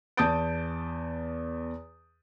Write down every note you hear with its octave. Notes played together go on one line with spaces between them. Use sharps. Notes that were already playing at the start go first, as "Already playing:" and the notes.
E2 A5 D#6 G6 A6 D7